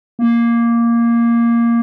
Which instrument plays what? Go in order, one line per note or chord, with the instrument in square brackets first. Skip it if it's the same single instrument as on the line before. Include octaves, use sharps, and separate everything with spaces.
[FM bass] A#3